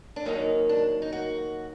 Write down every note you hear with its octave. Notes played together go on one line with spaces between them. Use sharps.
D4
D#2 D#3 F#3 A#3 D#4
D4
D#4
F#4